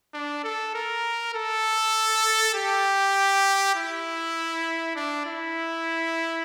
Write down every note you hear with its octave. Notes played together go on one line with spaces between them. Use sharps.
D4
A4
A#4
A4
G4
E4
D4
E4